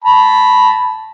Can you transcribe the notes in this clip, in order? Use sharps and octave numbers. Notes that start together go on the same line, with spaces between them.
A5 B5